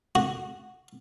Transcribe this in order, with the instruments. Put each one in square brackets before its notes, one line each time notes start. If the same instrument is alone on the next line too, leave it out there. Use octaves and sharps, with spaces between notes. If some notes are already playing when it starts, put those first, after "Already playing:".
[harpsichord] F#4